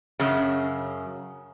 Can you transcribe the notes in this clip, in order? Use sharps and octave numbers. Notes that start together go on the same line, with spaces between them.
F#2 C#3